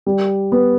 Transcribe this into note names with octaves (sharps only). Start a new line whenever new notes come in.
G3
B3